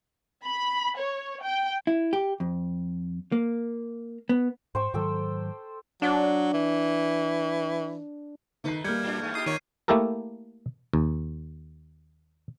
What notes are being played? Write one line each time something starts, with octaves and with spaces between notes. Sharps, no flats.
B5
C#5
G5
E4
G4
F2
A#3
B3
G#2 C5 G5 C#6
G#2 D#3 F#3 A4 G5 D6
F#3 D4
E3
D#3 A3 D#4 B4 C7
G3 A#3 F6 G6 G#6 C#7
A2 D4
E2 G2 A3
D#4 F4 G4 D#6 C7
D#3 C#5 D#7
A3 A#3 E4 G4 A4 A#4
D#2